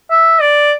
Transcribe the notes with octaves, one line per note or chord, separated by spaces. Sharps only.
E5
D5